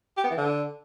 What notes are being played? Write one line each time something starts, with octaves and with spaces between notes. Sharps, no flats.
G4
B3
E3
D3